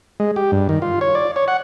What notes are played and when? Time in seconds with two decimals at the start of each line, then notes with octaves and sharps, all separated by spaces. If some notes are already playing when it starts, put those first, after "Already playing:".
0.20 G#3
0.36 G4
0.52 G2
0.69 D#3
0.82 F4
1.01 C#5
1.15 D5
1.36 C#5
1.48 F#5